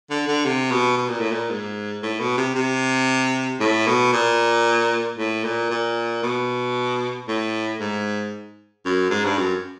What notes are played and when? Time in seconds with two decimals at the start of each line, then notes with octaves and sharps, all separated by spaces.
0.10 D3
0.27 D3
0.45 C3
0.71 B2
0.97 B2
1.09 A#2
1.20 A2
1.31 A#2
1.50 G#2
2.02 A2
2.20 B2
2.37 C3
2.55 C3
3.60 A2
3.86 B2
4.13 A#2
5.18 A2
5.44 A#2
5.70 A#2
6.23 B2
7.28 A2
7.80 G#2
8.85 F#2
9.10 G#2
9.24 G2
9.38 F#2